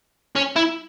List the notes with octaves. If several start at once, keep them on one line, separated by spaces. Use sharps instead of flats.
C#4
E4